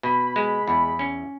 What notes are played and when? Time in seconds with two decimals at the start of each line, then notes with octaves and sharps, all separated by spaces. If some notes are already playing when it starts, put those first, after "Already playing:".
0.03 B2 B5
0.36 G#3
0.68 E2
0.99 C#4